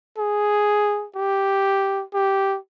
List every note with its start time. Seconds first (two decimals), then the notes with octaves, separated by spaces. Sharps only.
0.18 G#4
1.16 G4
2.14 G4